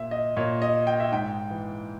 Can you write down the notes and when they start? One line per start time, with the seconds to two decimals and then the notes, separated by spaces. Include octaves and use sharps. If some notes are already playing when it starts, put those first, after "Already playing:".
Already playing: A#2 E5
0.11 D#5
0.37 A#2 C#5
0.62 D#5
0.87 G5
1.00 E5
1.12 G#2 G5
1.50 E3